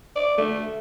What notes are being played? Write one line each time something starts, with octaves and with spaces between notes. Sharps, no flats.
D5
A3